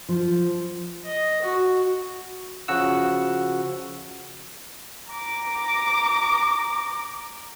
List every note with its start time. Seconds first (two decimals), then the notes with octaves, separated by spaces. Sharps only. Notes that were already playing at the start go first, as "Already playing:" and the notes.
0.09 F3
1.05 D#5
1.42 F#4
2.68 C#3 F3 F#4 F#5 E6
5.12 A#5 D6